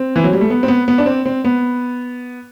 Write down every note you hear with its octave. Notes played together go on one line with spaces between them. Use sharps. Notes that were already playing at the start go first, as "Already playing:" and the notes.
Already playing: C4
E3
F#3
G3
A3
B3
C4
B3
B3
D4
C4
C4
B3